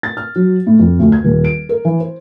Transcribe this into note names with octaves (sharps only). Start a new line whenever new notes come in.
A6
F6
F#3
A2
F2
D2
G#6
D#1
D7
A#4
E3
C5